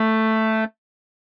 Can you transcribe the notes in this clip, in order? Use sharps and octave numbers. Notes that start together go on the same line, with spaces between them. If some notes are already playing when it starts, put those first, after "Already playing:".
Already playing: A3